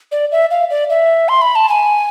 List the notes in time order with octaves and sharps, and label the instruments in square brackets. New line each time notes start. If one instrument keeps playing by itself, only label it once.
[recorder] D5
E5
F5
D5
E5
C6
B5
A5
G#5